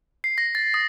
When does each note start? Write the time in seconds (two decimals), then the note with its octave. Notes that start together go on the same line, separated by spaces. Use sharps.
0.24 C7
0.38 A#6
0.55 A6
0.74 D#6